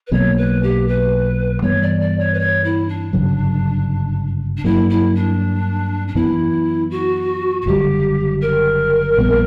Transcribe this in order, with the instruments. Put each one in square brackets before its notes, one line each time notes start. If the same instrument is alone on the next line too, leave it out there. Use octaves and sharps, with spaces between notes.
[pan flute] B4
[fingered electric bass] B1 B2 F#3 A#3 [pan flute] C#5
[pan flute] B4
G4
B4
[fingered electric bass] G2 E3 G3 B3 [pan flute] C#5
[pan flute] D5
D5
C#5
B4
C#5
E4
D4
[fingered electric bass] G1 F#2 C#3 F#3
[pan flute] D4
[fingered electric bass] G2 F#3 A#3 [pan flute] E4
[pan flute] E4
D4
D4
[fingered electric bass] F#2 E3 B3 [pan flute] E4
[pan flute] F#4
F#4
[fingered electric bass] F#1 F#2 D3 G3 [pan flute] G4
[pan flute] A#4
[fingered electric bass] A#1 A#2 G3 B3